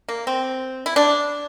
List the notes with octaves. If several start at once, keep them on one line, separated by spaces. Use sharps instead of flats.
A#3
C4
E4
D4